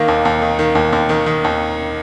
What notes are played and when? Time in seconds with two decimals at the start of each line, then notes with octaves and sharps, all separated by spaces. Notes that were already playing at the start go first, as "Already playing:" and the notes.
Already playing: D#3 A#3
0.08 D#2
0.25 D#2
0.42 D#3
0.59 D#3
0.75 D#2
0.93 D#2
1.09 D#3
1.26 D#3
1.44 D#2